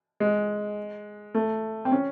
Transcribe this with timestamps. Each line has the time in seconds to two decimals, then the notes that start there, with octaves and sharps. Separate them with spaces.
0.20 G#3
1.34 A3
1.85 C4
1.92 C#4